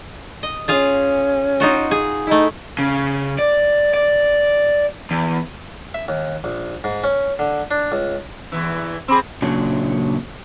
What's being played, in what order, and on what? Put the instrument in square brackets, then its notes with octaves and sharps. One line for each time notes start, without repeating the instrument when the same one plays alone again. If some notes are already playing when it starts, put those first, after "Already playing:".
[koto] D#5
[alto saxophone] C#4 [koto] F4 G#4 F5
[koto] D#4 F4 F#4
G#4
[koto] A3 E4 [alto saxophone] D#4
[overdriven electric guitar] C#3
D5
D5
E2
[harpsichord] E5
D#2
A#1
G#2
C#4
D3
D4
C#2
[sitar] E2 E3
[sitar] C4 G#4 [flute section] C5 B5 D6
[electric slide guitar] A#2 C#3 F#3 C#4 D4